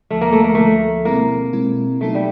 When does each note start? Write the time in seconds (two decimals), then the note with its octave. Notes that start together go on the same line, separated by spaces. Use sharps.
0.10 D2 D3 F3 A3
0.21 A#3
0.33 A3
0.44 A#3
0.55 D2 D3 F3 A3
1.05 B2 G#3 A#3 C4 E4
1.53 B2 G#3 C4 E4
2.01 B2 F#3 A3 B3 D#4
2.15 G3